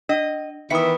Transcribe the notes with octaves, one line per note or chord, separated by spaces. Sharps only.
D4 D#5
D#3 E3 B3 E4 E5 D#6 C#7